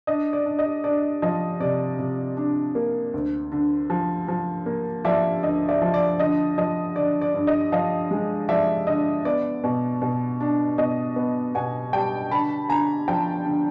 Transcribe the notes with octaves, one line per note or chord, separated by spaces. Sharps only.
D4 D#5
D5
D4
D#5
D4 D5
F3 D#5
C3 D5
C3
D4
A#3
D2
D3
F3
F3
A#3
F3 D5 E5
D2 D#5
D5 E5
F3
D5
D3 D#5
F3 D#5
D3 D5
D5
G2
D#5
F3 D#5 F5
G#3
F3 D5 E5
D3 D#5
B3 D5
B2
B2
D4
B2 D#5
B3
B2 F#5 G#5
G3 G5 A5
D3 A5 B5
D3 G#5 A#5
F3 G5 A5
D3